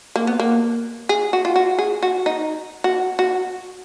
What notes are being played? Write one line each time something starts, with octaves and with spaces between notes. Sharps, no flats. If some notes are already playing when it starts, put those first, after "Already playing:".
A#3
B3
A#3
G#4
F#4
F4
F#4
G#4
F#4
D#4
F#4
F#4